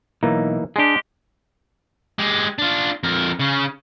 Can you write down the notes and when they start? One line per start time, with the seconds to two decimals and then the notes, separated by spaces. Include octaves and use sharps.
0.23 B1 E3 A#3 D#4
0.76 G#3 D4 G4 G#4
2.19 G#3 G4
2.58 D4 F4
3.04 F2 A#4
3.39 C#3 C#4